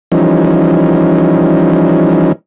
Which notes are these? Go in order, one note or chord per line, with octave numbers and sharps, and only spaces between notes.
E3 F3 G3 C#4 D#4